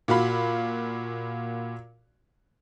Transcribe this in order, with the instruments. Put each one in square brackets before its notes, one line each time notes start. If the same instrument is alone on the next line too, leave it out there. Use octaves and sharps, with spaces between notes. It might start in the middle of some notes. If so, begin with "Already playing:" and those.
[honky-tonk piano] A#2 F#4 F5 B5